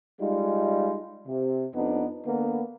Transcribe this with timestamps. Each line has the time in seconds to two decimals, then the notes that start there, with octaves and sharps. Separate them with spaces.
0.20 G3 G#3 D#4 F4
1.26 C3
1.74 F2 B3 D4 D#4
2.25 D3 A#3 B3